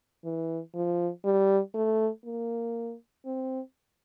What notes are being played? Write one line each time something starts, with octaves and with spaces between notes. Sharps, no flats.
E3
F3
G3
A3
A#3
C4